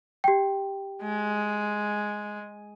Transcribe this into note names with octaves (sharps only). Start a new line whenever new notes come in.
G4 G5
G#3